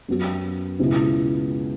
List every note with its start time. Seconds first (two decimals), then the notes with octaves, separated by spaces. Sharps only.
0.08 F#2 F#3 B3 F#4
0.79 C#2 B2 B3 E4